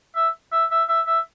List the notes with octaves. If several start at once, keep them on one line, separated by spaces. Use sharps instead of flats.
E5
E5
E5
E5
E5